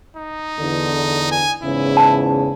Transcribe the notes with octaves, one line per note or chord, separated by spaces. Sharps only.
D#4
E2 D3
G#5
E2 G#2 C#3 E4
A5